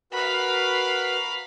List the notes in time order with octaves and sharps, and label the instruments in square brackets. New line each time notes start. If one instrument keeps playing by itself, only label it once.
[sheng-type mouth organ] F#4 A#4 B4 [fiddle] F5 B5